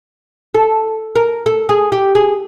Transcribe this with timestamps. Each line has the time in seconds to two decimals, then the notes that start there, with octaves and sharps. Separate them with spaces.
0.55 A4
1.16 A#4
1.46 A4
1.69 G#4
1.92 G4
2.15 G#4